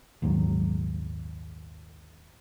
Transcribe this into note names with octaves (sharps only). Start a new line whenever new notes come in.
A#1 D#2 G#2 F#3